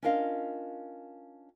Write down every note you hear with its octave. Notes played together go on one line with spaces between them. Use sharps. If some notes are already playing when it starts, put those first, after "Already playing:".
C#4 D4 F4 A#4 D#5 F5